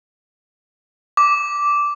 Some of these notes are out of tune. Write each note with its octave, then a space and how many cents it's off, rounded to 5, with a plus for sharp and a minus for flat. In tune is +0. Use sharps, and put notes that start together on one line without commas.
D6 -10